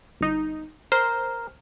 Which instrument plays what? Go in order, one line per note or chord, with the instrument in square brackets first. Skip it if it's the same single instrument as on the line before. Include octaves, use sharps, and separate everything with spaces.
[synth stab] G1 D#4
[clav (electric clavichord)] A#4 [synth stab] C5